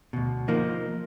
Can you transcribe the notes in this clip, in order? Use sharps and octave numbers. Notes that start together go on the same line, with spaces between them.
D2 B2
F3 A#3 D#4